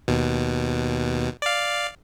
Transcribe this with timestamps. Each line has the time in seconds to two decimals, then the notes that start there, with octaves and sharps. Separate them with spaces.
0.08 D#2 B2
1.42 D5 F5